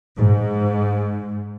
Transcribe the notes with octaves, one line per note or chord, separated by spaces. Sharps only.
G#2